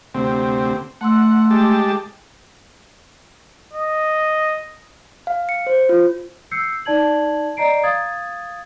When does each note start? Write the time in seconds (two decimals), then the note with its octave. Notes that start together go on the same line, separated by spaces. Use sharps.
0.15 D2 C3 C4
1.01 A3 F#5 C6 E6
1.51 G#3 G4 A5
3.74 D#5
5.27 F5
5.49 C#7
5.67 C5
5.89 F4
6.51 E6 G6 C7 C#7
6.85 D#4 D5 A5 G#6 F#7
7.57 D5 D#5 A#5 C7 D7
7.83 F5 D#6 G#6 A6